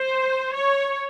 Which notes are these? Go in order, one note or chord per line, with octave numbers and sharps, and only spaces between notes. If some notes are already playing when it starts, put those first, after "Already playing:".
Already playing: C5
C#5